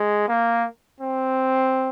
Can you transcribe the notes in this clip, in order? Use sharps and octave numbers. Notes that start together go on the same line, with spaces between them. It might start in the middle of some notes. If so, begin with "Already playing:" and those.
Already playing: G#3
A#3
C4